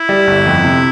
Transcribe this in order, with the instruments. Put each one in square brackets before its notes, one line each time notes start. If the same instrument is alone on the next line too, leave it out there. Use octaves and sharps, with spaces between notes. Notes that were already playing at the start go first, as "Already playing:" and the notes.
Already playing: [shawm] E4
[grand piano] G3
G1
F2
C3